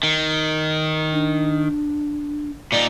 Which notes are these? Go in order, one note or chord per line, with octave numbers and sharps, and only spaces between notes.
D#3
D4
A#2 D#4 D5